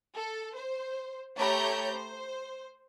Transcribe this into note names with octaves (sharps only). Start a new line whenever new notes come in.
A4
C5
A3 G4 C#5 A#5 B5 G6
C5